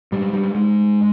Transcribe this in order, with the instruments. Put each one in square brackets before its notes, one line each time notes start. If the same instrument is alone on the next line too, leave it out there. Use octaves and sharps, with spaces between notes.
[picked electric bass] G#2 G3
G3
G#3